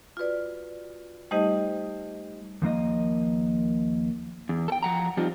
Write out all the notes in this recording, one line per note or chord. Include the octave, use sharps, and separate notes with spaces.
F4 F#4 B4 D5
G3 A3 D#4 G4 C5 D#5
D#2 F3 A#3 D#5
E2
A4 G5
F3 F#5 A#5
F3 G3 C4 D#4 F4